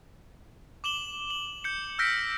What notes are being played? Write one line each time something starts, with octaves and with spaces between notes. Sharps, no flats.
D6 E7 F#7 G7
F#7
G6 C#7
E6 F6 G6 A#6 B6 D7